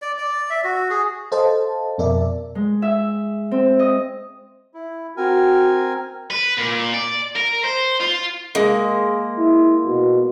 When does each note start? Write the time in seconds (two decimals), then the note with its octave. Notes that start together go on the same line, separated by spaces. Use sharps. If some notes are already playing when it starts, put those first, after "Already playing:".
0.02 D5
0.18 D5
0.50 E5
0.64 F#4
0.90 G#4
1.32 A4 C5 D#5 F5 A5
1.98 F2 B2 A#4 D5 E5
2.55 G#3
2.82 E5
3.51 C4
3.79 D#5
4.74 E4
5.17 C4 F#4 A#4 G#5
6.30 B4
6.58 A#2
6.94 D5
7.36 A#4
7.64 C5
8.01 F4
8.55 G#3 A#3
9.38 E4
9.86 B2